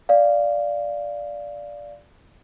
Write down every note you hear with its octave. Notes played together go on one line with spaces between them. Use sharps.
D5 F5